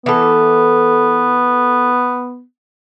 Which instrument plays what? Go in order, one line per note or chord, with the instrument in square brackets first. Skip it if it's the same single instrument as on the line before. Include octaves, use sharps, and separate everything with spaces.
[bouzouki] E3 A4 [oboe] B3